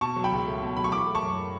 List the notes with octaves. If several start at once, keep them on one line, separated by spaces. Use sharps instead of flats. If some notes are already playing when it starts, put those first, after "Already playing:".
B2 A5 C#6
F#3
G5 B5
C#2
A3
B2
F#3 B5
C#6
E3 B5 D6
A3
A5 C#6
F#2